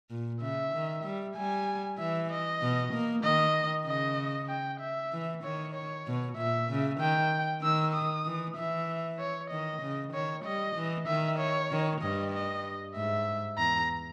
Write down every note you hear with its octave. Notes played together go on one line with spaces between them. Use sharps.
A#2
C#3 E5
D#3
G3
G3 G#5
E3 E5
D#5
B2
A#3
D#3 D#5
C#3 D#5
G5
E5
E3
D#3 C#5
C#5
B2
A#2 E5
C#3
D#3 G5
D#3 E6
D#6
E3
E3 E5
C#5
D#3 D#5
C#3
D#3 C#5
G3 D#5
E3
D#3 E5
C#5
D#3
G2 D#5
D#5
G#2 E5
E2 A#5